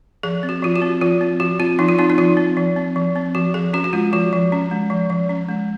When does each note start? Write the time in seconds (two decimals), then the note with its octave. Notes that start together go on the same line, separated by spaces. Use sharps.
0.23 F3 G#4
0.43 C4
0.49 F#4
0.62 F3 F4
0.76 F#4
0.82 C4
1.01 F3 F4
1.21 C4
1.40 F3 F#4
1.60 C4 F4
1.79 F3 D#4
1.88 F4
1.99 C4 D#4
2.10 D#4
2.18 F3 F4
2.37 C4
2.57 F3
2.76 C4
2.96 F3
3.16 C4
3.35 F3 F#4
3.54 F3 G#4
3.74 C#4 F#4
3.84 F#4
3.93 G#3 F4
4.13 F3 F#4
4.33 F3
4.52 C#4
4.71 G#3
4.90 F3
5.10 F3
5.29 C#4
5.49 G#3